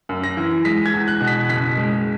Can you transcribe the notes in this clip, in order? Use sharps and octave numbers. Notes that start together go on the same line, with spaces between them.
F#2
A#6
E3
G#3 B6
G#6
E2
F#6
B2
B6
F#1 B6
G#3